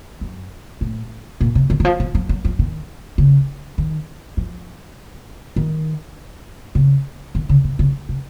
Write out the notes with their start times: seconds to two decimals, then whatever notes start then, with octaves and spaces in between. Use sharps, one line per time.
0.21 F#2
0.81 A2
1.41 A#2
1.55 C3
1.70 D#3
1.80 D#3
1.85 F3
2.00 F3
2.15 F3
2.29 F#3
2.45 F3
2.59 D#3
3.18 C#3
3.78 D#3
4.37 F3
5.56 D#3
6.75 C#3
7.35 D#3
7.49 C#3
7.64 C3
7.79 C#3
8.09 C3